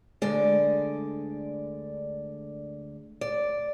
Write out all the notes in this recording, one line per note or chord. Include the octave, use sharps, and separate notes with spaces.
D2 D3 G#3 D5
D5